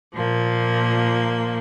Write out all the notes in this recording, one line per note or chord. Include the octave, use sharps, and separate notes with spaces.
A#2 F3 A#3